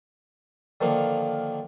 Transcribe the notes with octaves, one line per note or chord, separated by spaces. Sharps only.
D3 D#3 F3 A#3 F5